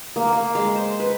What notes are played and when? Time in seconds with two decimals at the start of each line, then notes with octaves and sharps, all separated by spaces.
0.16 A#3
0.33 A#3
0.55 G#3
0.76 C5
1.00 B4